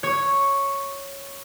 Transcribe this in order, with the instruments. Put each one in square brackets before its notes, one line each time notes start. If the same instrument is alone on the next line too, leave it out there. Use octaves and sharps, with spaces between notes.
[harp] C#5